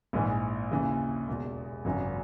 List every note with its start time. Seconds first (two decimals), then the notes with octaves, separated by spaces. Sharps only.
0.13 A#1 G#2 E3
0.71 D#2 C#3 E3
1.28 E1 E2 B2
1.85 G#1 F#2 C#3